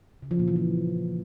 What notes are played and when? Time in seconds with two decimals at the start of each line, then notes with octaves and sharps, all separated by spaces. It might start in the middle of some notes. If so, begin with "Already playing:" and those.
0.22 C#3
0.31 F3
0.39 A#2
0.48 E3
0.56 F3